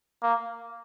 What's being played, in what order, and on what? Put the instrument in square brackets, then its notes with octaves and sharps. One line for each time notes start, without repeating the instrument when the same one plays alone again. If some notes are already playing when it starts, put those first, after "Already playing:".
[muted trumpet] A#3